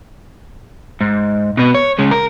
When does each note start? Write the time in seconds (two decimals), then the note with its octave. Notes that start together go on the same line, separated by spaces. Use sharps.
1.01 G#2
1.57 B2 B3
1.75 C#5
1.99 C#3 G#3
2.11 A#4